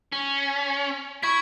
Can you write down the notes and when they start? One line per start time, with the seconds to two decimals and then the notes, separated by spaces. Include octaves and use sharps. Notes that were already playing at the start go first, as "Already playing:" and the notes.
0.12 C#4
1.23 E4 C#6 G#6 B6